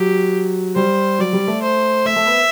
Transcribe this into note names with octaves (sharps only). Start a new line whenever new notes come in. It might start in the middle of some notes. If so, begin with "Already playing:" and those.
Already playing: F#3 G4
G3 C5
F#3 D5
G3
A3
C5
A3 E5
A3
B3